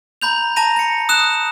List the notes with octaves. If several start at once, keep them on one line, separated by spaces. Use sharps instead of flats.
A#5 B5 G6 F7
A5 A#5 A#6 D#7 F7
A#6 C#7
D#6 F#6 E7